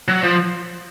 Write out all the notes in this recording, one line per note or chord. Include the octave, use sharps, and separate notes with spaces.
F#3
F3